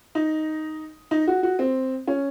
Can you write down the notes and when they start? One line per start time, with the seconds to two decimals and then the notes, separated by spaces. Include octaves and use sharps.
0.15 D#4
1.11 D#4
1.27 F#4
1.43 F#4
1.59 C4
2.07 C#4